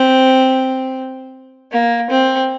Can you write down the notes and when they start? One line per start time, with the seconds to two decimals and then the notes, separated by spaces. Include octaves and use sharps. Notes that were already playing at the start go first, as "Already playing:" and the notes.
Already playing: C4
1.72 A#3
2.11 C4